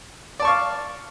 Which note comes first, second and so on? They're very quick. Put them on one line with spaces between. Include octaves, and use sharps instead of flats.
D5 A5 C#6 F5